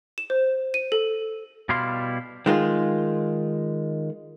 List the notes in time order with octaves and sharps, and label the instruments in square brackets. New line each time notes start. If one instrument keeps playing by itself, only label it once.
[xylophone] E7
C5
D#7
A4
[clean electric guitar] B2 G3 E4 F5 C6
[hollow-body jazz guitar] D#3 G#3 F4